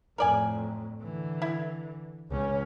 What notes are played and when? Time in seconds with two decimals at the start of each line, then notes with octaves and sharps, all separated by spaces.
0.18 F2 A2 A#4 D5 G#5
1.02 D3 E3
1.42 E4
2.29 C#2 C#4